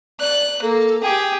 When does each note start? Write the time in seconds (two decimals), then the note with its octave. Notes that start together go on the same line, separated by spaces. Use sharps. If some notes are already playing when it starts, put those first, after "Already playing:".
0.20 D5 F#6
0.62 A#3 A4
1.02 G4 G#4 G5